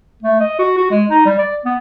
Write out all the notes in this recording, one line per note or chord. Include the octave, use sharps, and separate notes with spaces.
A3
D#5
F#4
F#4
G#3
D#4
G3
D5
B3